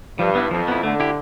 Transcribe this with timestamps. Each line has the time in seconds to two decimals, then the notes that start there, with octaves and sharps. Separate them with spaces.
0.19 G2 F3
0.35 B3 E4
0.51 F2 F3
0.68 B3 E4
0.83 D3 A3
1.00 E4 G4